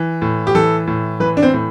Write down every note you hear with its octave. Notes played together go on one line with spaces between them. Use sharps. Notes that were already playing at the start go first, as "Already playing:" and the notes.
Already playing: E3
A2
G4
E3 A4
A2
E3 B4
D4
C4
A2